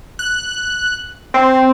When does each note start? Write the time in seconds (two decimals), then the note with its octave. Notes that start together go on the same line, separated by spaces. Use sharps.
0.19 F#6
1.34 C4